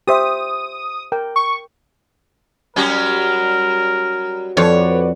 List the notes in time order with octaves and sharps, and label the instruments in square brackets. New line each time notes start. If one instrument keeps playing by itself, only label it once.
[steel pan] G4 C5 E5 [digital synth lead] D#6
[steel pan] A#4 G5
[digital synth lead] C#6
[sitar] F#3 G3 C#4 [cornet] A#4
[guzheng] F2 [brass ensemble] F#4 B4 D5 [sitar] C#5